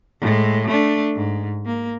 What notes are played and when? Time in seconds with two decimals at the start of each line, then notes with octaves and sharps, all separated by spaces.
0.21 A2 G#3
0.67 A3 D4
1.15 G#2
1.66 A#3